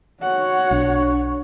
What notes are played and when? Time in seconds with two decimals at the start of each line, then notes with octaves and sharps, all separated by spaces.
0.21 F#4 C#5 F#5
0.71 B1 D4